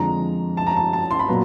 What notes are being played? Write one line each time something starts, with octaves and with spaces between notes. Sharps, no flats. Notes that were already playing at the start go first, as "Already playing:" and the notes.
Already playing: F2 D3 F3 G#3 A#5
A5
A#5
A5
A5
C6
B5
A#2 F#3 B3 A#5